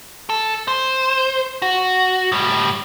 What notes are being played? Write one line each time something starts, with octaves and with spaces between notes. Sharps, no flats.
A4
C5
F#4
A2 G3